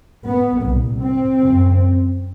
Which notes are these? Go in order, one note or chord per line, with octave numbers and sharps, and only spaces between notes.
B3
C2 A#2
C4
F#2 C#3